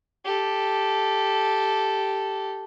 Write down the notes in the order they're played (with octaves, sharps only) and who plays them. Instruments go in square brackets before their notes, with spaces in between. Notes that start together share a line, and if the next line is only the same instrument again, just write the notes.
[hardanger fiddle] G4 A4